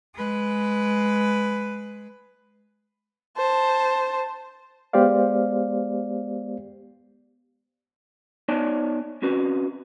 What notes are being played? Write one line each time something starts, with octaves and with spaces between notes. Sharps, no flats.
G#3 B4
C5 A5
G#3 B3 G4 C5 D5 F5
B3 D#4 C#5 D5 G#5 A5
C4 C#4 F#4 B4